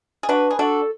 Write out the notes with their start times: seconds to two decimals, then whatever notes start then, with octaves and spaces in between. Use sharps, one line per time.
0.23 G#4
0.29 D4 F#4 B4
0.51 G#4
0.59 D4 F#4 A4